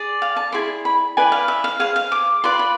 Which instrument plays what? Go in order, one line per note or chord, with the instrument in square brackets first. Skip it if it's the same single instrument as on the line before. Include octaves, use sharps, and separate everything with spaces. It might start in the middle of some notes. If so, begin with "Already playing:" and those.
Already playing: [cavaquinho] G#4 D5
F5
A5
E4 G#4 D5 C6
B5
E4 B4 D5 G#5
F5
E5
F5
G#4 C5 F5
F5
D6
F4 B4 D5 C6
B5